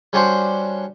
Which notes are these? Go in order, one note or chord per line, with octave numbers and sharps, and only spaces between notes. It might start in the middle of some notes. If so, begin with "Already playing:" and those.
G3 C#4 D4 F#4 C5